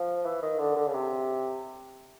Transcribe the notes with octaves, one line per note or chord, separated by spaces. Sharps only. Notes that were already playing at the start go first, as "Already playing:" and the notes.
Already playing: F3
E3
D#3
D3
D3
C#3
C3